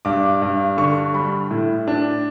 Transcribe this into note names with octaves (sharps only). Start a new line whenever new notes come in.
G2 D6
G2
D3 C#6
G3 B5
A2
D4